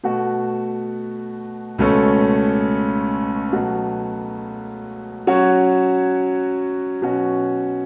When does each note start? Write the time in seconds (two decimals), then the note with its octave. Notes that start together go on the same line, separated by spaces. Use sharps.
0.04 B2 A3 F#4
1.78 C#2 B2 A3 C#4 A4
3.52 B2 F#3 A3 F#4
5.27 F#3 C#4 F#4 C#5
7.02 B2 F#3 C#4 F#4